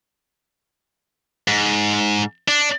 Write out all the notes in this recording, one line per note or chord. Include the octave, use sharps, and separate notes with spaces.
G#2
D4